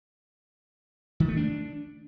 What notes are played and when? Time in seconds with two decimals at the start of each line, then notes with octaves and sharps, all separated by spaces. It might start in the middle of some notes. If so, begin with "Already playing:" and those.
1.20 D#3
1.28 A3
1.37 D4